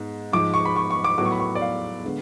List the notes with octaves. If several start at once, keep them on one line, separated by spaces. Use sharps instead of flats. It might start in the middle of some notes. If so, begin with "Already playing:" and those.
Already playing: G#2 G#3 B3
G#2 F3 G#3 D6
C#6
B5
C#6
C#6
D6
A2 F#3 B3 D6
C#6
B5
C#6
D5
F5
D3 G#3 B3